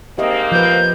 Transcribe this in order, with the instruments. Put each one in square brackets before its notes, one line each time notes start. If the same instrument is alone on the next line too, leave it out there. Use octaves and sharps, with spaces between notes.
[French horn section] G#2 A#3 C4 [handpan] G4 D#5 E5
[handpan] F3 B4 [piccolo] G6